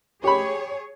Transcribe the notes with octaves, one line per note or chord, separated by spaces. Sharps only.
G4 G#4 C#5 B5